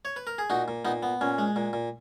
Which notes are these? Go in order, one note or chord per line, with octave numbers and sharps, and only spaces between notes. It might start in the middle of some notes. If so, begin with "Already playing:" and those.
C#5
B4
A#4
G#4
A#2 D#4 F#4
A#2
A#2 B3 D#4
B3
A#2 C#4
G#3
A#2
A#2